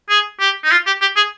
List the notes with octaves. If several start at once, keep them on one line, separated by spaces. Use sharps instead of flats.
G#4
G4
D#4
F4
G4
G4
G#4